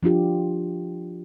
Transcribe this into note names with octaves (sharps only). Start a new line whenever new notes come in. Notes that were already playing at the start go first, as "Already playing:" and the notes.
F3 D4 F4 G4